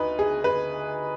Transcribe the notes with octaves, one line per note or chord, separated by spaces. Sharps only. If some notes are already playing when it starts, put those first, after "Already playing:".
Already playing: D2 D#4 B4
G#4
B4